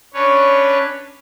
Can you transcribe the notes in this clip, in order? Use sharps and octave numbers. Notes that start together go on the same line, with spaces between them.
C#4 D4 B4 C#5